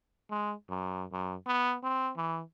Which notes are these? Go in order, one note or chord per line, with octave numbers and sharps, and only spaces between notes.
G#3
F#2
F#2
B3
C4
E3